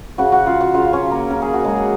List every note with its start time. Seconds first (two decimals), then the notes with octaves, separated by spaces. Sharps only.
0.18 C#3 F#4 F#5
0.32 F#4 F#5
0.46 C#3 F4 F5
0.60 F#4 F#5
0.74 C#3 F4 F5
0.93 C#4 C#5
1.02 F#3
1.11 A#3 A#4
1.30 C#3 A#4
1.42 G#4
1.53 F#4
1.59 F#3
1.64 G#3 G#4